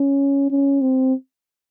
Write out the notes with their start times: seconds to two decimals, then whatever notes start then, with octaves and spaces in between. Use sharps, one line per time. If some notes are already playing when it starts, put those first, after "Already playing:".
Already playing: C#4
0.50 C#4
0.81 C4